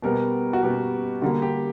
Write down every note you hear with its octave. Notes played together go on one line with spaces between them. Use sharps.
B2 G3 B3 A#4
F#4
B2 G3 B3 G4
D3 G3 A#3 F#4
G4